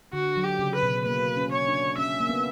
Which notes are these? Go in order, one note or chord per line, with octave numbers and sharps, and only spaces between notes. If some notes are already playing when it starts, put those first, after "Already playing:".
D3 F#4
F#3
G4
C#3
B4
B2
A#3 B4
C#4
C#5
D4
C#4 E5
A#3
B3